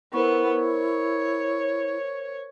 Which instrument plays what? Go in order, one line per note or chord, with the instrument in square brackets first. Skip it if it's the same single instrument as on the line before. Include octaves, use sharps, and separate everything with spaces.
[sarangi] B3 [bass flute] E4 [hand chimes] A#4 C5 C#6
[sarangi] C#5